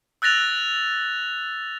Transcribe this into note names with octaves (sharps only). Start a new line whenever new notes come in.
E6 F#6 A6 A#6 F7